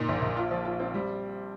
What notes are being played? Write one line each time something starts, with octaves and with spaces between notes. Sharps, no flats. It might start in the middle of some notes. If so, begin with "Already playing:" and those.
Already playing: A#2 D#4
A#1
A#1
F4
F3
F4
C4
G3